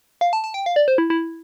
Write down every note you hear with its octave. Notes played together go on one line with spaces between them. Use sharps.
F5
A5
A5
G5
F5
D5
C5
E4
E4